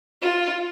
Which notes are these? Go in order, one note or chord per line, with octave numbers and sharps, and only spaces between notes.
F4